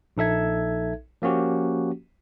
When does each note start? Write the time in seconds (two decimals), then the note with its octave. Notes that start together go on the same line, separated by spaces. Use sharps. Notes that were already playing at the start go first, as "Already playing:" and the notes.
0.17 A#1 D#4 A4 E5 G#6
1.22 F3 A#3 C#4 F#4 G4